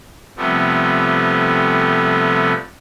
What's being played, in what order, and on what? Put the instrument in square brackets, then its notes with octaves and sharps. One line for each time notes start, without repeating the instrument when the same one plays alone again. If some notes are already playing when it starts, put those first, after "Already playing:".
[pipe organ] C3 F3 G3 A3 B3